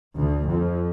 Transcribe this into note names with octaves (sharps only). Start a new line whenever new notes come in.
D2
F2